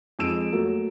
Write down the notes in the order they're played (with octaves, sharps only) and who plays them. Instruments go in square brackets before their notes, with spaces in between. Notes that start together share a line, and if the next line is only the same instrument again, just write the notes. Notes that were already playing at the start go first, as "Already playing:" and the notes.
[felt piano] F2 G#3 E6 D7 E7
F#3 A3 A#3